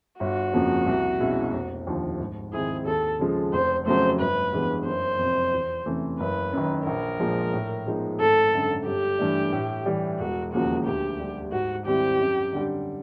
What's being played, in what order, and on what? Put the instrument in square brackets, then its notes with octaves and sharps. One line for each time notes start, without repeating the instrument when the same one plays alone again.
[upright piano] G1 [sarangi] F#4
[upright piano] F2 C#3 F3 A#3
C2
B2 G#3 C#4 E4
F1
D#2 D3 F3
G#2
[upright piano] D#3 G#3 C4 E4 [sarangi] G#4
[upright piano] D#2 [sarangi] A4
[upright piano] C#3 F3 G#3
[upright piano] F1 [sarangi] C5
[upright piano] F2 C#3 F#3 A3 [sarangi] C5
[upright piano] G1 [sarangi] B4
[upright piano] G2 E3 G#3 B3
[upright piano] F#1 [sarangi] C5
[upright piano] F2 C3
E2
C3 E3 A3 C#4
[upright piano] F#1 [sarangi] B4
[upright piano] F#2 D#3
[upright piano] A#1 [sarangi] A#4
[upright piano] A#2 F3 G#3
A2
F3 G#3 B3 D#4
[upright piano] G#1 [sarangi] A4
[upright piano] F#2 D3
[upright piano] G1 [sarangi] G4
[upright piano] G2 E3 A3 D4
A2
E3 G3
[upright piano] E1 [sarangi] F#4
[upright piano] D#2 C#3 F3 A#3 [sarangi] F#4
[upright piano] D2 [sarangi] G4
[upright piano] D3 G3
[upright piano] G#2 [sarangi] F#4
[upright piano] D#3 G3 C4 E4 [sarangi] G4
[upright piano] F#2
D3 G3